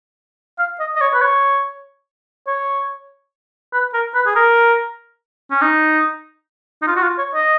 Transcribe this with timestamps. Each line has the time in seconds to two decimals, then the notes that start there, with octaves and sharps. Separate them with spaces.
0.59 F5
0.80 D#5
0.96 D#5
1.01 C#5
1.13 B4
1.22 C#5
2.47 C#5
3.73 B4
3.94 A#4
4.15 B4
4.26 G#4
4.36 A#4
5.50 C#4
5.61 D#4
6.82 D#4
6.87 F4
6.96 F#4
7.02 F4
7.18 C#5
7.34 D#5